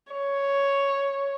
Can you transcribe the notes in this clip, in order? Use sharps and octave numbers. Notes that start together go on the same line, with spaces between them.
C#5